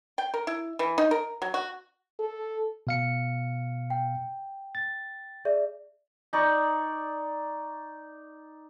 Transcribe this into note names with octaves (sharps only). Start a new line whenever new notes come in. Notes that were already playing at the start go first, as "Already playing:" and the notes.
G5
A#4
E4
E3
D#4
A#4
F#3
F#4
A4
B2 F5 C#7
G5
A6
G#4 D5 E5
D#4 D5 C#6